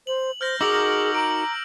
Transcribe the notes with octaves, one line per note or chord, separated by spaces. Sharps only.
C5 F#7
C5 F6 G6 A#6
D#4 F#4 G#4 A#4 D6 E6 F#7
A#5 D6 D7